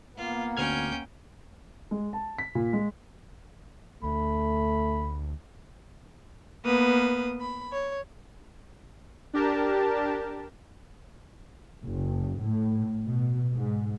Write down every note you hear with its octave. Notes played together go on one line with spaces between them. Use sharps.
A#3 B3 F4
D2 C#4 G5 F6 G#6
G#3
A5
B6
A#2
G#3
D2 A3 B5
A#3 B3 B4 D#6 F6
B5
C#5
D4 G4 A#4 A5
F#1
A2
B2
G#2